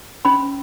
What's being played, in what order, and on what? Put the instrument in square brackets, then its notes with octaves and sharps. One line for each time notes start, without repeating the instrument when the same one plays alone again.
[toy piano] C#4 B5